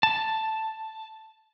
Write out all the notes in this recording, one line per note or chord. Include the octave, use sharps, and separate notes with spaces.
A5